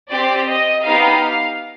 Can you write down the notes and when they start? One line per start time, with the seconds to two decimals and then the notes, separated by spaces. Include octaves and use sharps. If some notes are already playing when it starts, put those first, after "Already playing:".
0.11 C4 G4 D5
0.48 D#5
0.85 B3 D#4 G4 F5